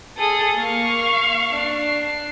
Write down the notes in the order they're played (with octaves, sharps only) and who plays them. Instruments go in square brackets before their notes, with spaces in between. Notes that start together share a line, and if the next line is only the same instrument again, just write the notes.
[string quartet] G#4 A4 [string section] D#6
[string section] A#3 [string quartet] F5 C#6
[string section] D4 C7